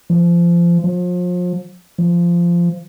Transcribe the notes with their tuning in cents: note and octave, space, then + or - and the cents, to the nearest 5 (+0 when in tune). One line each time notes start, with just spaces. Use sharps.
F3 -25
F3 +35
F3 -15